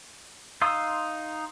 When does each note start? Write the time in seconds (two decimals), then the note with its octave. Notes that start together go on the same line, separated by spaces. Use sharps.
0.62 D#4 F5 C6 D#6 E6